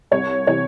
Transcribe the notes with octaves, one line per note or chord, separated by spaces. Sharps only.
C2 C#5
C3 E3 C#5